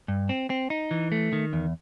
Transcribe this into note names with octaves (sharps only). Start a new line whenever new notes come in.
G2
C4
C4
D#4
E3
A3
D#3
E2